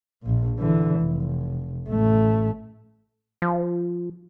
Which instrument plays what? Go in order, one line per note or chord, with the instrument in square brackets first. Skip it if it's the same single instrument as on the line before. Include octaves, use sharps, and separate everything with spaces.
[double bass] A#1 A#2
D3 E3
F1
A1 A3
[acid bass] F3